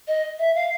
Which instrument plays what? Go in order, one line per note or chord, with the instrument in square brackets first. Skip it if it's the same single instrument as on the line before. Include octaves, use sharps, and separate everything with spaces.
[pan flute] D#5
E5
F5